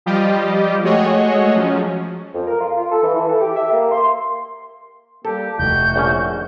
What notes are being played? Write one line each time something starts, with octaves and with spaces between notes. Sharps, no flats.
F3 G3 F4 G4 D#5
G#3 A3 F#4 G#4 C#5 D#5
F3 F#3 C#4
F2
A#4
F4
F4
A4
E3
E3
A4
G4
E5
A#3
C6
G3 A#3 G4 A4
F1 E4 F#4 G6
A#1 C#4